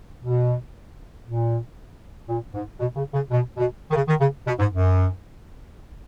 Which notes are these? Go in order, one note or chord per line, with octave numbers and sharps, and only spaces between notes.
B2
A#2
A#2
G#2
B2
C#3
C#3
B2
B2
D#3
C#3
D#3
C#3
B2
G#2
F#2